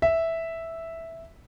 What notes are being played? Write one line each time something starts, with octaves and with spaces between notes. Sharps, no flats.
E5